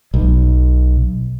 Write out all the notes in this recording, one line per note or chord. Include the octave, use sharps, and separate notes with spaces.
B1